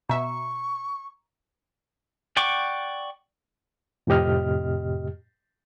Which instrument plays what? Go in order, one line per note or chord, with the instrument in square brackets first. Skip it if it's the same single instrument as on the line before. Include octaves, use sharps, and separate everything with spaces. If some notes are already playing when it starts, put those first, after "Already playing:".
[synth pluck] B2 E5 [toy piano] A#5 [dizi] C#6
[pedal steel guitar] D5 F#5 G5 C#6 D6
[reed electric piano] F2 A2 C3 G4 D#5 F6